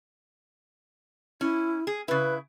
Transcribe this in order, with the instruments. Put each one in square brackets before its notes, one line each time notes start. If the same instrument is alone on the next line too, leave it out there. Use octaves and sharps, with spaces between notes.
[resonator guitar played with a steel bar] C#4 [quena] E4
[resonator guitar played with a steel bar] G#4
[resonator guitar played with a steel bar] C#3 E4 [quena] B4